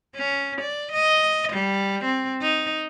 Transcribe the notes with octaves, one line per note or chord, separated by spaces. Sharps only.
C#4
D5
D#5
G3
C4
D#4